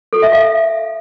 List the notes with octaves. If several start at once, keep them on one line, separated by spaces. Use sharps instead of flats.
A4
E5
F5